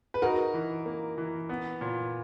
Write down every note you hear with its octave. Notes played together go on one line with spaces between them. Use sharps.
B4
D#4 F#4 A#4
E3
A#3
E3
B3
A#2